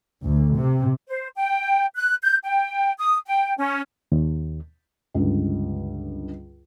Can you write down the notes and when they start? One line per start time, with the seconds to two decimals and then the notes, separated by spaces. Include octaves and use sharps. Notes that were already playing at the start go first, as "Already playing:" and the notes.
0.25 D2
0.56 C3
1.08 C5
1.36 G5
1.96 F#6
2.23 G6
2.44 G5
2.98 D#6
3.26 G5
3.58 C#4
4.12 D#2
5.14 C#2 G2 D3